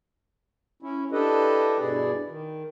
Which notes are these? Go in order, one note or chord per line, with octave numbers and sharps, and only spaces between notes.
C#4 E4
D4 E4 G4 A4 B4 D#5
G2 B2 E4 G#4 D5
D#3